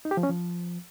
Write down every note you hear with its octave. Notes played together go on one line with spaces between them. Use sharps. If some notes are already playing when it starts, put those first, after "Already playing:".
D#4
G4
F3
C#4
F3